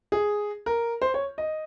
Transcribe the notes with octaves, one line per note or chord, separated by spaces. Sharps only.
G#4
A#4
C5
C#5
D#5